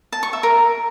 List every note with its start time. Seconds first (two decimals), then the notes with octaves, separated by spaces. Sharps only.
0.12 A5
0.23 C#6
0.33 E5
0.43 A#4